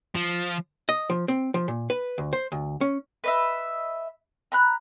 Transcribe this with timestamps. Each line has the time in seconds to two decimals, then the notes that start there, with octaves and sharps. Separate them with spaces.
0.15 F3
0.89 D#5
1.10 F3
1.28 C4
1.54 F3
1.68 A#2
1.90 B4
2.18 D2
2.33 C5
2.52 D2
2.81 C#4
3.24 B4 D#5 E5
4.52 A#5 B5 F#6